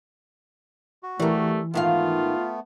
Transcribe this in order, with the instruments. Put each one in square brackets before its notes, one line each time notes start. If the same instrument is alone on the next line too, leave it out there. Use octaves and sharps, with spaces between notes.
[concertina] F#4
[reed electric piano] E3 [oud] G3 A#4 [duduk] A3
[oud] G#2 D#3 F5 [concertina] A3 B3 [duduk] F4